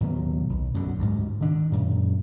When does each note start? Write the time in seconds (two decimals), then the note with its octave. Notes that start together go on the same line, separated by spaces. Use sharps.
0.01 D#2 B2 F#3 A#3
0.49 B1
0.74 F#2 B2 D3
0.99 D2 G#2
1.41 D#3 D4
1.72 F#2 A#2